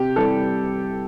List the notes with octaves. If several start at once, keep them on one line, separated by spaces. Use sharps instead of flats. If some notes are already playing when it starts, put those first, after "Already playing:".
Already playing: C3 G4
E3 G3 A4